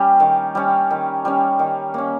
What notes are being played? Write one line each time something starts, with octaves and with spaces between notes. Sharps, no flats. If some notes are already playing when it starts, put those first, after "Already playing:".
Already playing: G3 C#4 G4
D#3
G3 C#4
D#3
G3 C#4
D#3
A#3 C#4